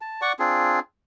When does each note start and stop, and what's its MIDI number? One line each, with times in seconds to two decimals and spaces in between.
0.01 0.21 81
0.22 0.32 74
0.22 0.32 78
0.22 0.32 85
0.39 0.79 60
0.39 0.79 62
0.39 0.79 65
0.39 0.79 68